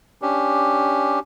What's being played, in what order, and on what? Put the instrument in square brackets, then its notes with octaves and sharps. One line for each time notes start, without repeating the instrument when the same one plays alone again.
[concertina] C#4 D4 G4